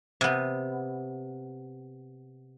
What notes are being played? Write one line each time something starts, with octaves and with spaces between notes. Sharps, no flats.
C3 B3